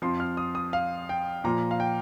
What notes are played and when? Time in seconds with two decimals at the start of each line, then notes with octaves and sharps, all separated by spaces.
0.02 F2 F3 C6
0.20 F6
0.37 D#6
0.55 D#6
0.73 F5
1.09 G5
1.44 A#2 F3 A#5
1.71 F5
1.80 G5